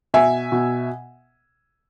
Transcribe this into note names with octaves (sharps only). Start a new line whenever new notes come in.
B2 E5 G#5
B2